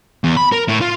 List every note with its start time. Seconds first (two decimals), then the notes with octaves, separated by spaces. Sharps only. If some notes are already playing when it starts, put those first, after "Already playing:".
0.24 E2
0.37 B5
0.52 A#4
0.68 A2
0.81 F4